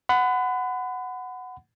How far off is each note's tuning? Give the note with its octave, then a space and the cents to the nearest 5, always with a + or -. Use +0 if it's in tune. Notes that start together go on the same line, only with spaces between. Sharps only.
F#5 +0 B5 +35